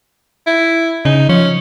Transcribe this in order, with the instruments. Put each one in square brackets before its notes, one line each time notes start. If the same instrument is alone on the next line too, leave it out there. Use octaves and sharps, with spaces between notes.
[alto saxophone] E4
[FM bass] C#3 [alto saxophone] D#4
[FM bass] F3 [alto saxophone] C#4